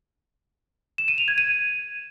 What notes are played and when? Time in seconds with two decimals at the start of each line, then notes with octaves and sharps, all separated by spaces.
0.98 E7
1.08 D#7
1.18 F7
1.28 G#6
1.38 D#7